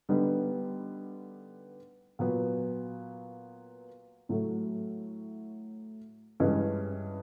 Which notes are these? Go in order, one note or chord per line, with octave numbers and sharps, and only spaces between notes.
D3 G3 B3 D#4
A#2 F#3 B3
A2 F#3 A3
G2 E3 G#3 C#4